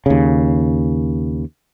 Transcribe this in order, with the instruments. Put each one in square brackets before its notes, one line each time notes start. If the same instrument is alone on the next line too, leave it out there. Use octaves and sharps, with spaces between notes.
[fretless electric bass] D#2 C#3